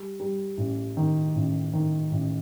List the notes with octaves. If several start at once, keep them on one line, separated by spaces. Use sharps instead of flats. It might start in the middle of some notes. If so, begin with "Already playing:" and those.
Already playing: G3
G3
A1
D#3
A1
D#3
A1